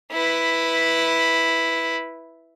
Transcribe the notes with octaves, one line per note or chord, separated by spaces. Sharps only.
E4 B4